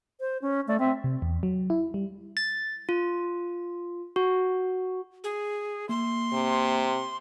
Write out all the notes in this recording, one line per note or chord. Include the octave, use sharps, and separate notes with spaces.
C5
C#4
A3 D5
C4 E5
C3
E2
F#3
E4
G3
A6
F4
F#4
G#4
A#3 C6
C3